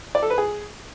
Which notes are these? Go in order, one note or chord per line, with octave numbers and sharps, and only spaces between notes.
D5
A4
B4
G#4